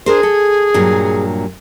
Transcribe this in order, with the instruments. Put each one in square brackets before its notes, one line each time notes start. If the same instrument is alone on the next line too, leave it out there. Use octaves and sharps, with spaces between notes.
[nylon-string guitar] D4 A#4 C5 [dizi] G#4
[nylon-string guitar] A4
G2 A#2 F#3